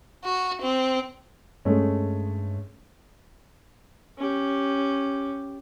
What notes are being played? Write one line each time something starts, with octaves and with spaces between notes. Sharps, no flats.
F#4
C4
G2 G#3 A3 C#4
C#4 G4